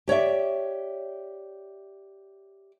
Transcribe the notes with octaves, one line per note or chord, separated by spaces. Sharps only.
G4 C#5 D5 E5